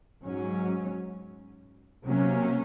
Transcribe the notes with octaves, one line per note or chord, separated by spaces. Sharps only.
G#2 F#3 C#4
C3 F#3 A#3 C#4